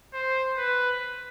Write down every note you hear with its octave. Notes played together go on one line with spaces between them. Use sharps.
C5
B4